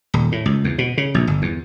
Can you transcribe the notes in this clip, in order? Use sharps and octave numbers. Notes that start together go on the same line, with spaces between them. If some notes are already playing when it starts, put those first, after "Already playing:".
D#1
A2
C#2
E2
B2
C#3
A#1
G1
E2